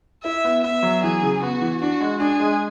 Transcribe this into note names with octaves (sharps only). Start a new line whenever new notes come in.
E4 E5
B3
B3 E5
F#3
E3 G#4
C#3
B3 F#4
E3
D4 F#4
G#3
D4 G#4
G#3